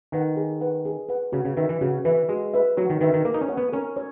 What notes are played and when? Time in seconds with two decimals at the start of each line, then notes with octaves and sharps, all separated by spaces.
0.12 D#3 B4 F#5
0.37 G#4
0.61 B4 F#5
0.85 G#4
1.09 B4 F#5
1.32 C#3 F#4
1.45 C#3
1.57 D#3 B4 E5
1.69 E3
1.81 C#3 F#4
2.05 E3 B4 E5
2.29 G#3 F#4
2.53 B4 E5
2.77 F#3 F#4
2.90 D#3
3.01 D#3 B4 E5
3.13 D#3
3.25 A#3 A#4
3.34 D#4
3.41 C#4
3.49 C#5 F#5
3.57 B3
3.73 C#4 A#4
3.97 C#5